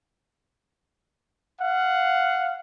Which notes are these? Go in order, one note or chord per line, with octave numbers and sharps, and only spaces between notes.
F5 F#5